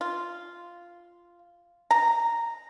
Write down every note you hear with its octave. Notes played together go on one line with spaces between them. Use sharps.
F4
A#5